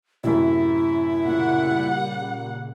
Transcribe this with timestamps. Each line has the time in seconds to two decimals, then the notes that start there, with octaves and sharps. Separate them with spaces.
0.24 F#2 A2 C3 E4
1.25 A#2 C#3 G3 A#3 F#5